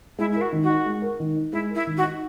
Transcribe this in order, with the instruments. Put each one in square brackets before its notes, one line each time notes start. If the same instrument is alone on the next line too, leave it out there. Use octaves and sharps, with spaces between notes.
[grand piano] G#3 [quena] E4
[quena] E4 [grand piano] A#4
[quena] F#4
[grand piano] D#3
[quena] F#4
[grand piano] D#4
G#3
A#4
D#3
D#4
[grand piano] G#3 [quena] E4
[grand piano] A#4
[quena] E4
[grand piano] D#3
[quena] F#4
[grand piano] D#4